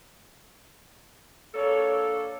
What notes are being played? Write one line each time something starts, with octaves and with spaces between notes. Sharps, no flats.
A#3 D4 A4 C#5